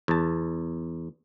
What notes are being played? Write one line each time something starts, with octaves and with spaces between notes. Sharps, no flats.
E2 A5